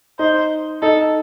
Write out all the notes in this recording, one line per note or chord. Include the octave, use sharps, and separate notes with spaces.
D#4 C5
D#4 A4